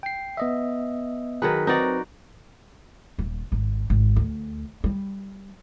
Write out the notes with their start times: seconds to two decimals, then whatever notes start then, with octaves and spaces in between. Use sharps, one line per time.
0.03 G5 C7
0.37 B3 D#5 E5
1.42 D#3 F#3 G#4 B4
1.67 C4 D#4 F#4 B4 D5
3.18 D#1
3.52 G#1
3.90 G#1
4.16 D2
4.84 G3